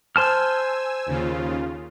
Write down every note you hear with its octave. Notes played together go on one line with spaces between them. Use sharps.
C5 G#5 A5 E6 F6
D#2 C#3 F4